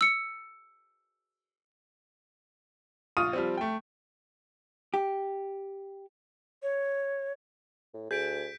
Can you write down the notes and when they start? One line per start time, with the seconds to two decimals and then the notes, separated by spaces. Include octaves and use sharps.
0.01 E6 C#7
3.17 A#1 F4 C#6 D#6 F6 D#7
3.33 F3 G3 C4
3.57 A3 G5
4.94 G4
6.63 C#5
7.94 A2
8.11 D2 G#4 G6 B6 D7